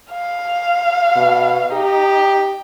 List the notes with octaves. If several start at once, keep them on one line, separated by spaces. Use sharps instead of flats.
F5
B2
D#4 G4